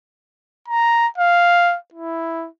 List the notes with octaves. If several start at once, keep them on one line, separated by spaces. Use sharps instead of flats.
A#5
F5
E4